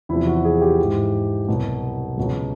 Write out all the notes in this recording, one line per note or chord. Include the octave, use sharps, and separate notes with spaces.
E2 C3 F3 E4
F#4
G#4
G4
G#2 E3
C2 B2 F#3
C#2 B2 F#3